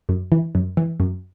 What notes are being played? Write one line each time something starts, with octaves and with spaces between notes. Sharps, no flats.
F#2
E3
F#2
E3
F#2